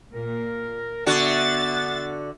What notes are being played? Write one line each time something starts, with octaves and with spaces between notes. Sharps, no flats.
A#2 A#4
D3 B3 F#4 E5 F#5 A6